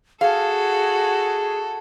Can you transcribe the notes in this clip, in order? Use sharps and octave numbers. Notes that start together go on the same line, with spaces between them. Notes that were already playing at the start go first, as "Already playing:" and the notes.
F#4 G#4 A4 F5